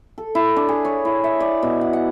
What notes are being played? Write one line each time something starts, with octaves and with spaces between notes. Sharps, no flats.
A4
E4
D4
G#4
C#5
E4
E5
D5
B2
F#5
F#5